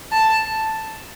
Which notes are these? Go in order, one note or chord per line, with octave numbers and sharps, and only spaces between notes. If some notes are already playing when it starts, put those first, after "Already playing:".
A5